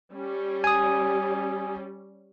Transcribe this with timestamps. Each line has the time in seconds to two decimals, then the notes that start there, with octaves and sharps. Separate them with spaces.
0.12 G3 C#4
0.64 G#5 D#6